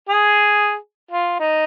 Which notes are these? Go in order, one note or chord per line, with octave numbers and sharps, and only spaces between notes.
G#4
F4
D#4